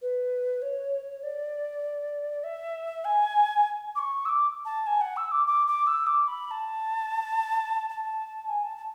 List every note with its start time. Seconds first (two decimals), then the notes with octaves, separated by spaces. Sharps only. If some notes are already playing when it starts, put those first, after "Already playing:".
0.02 B4
0.62 C#5
1.23 D5
2.43 E5
3.04 G#5
3.95 D6
3.98 C#6
4.25 E6
4.29 D6
4.65 A5
4.86 G#5
5.01 F#5
5.16 E6
5.31 D6
5.46 D6
5.67 D6
5.86 E6
6.06 D6
6.28 B5
6.47 B5
6.51 A5
7.89 A5
8.49 G#5
8.62 A5
8.76 A5